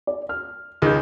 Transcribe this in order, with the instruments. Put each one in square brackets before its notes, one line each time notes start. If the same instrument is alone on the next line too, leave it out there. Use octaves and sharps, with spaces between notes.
[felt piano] D5
F6
[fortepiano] C#2 D#3 [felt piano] G#4 G6